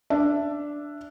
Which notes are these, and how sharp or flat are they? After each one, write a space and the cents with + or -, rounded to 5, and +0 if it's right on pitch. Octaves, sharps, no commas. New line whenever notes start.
D4 +0 E5 +15